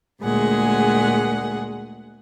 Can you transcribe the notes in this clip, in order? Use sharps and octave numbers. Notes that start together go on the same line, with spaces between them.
D2 A#2 G#3 G#4 F#5